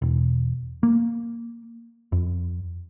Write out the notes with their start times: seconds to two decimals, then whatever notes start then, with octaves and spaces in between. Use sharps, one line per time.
0.02 E1
0.83 A#3
2.12 F2